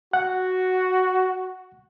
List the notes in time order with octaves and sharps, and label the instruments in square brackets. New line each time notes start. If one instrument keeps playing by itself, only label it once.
[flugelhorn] F#4 [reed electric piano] F#5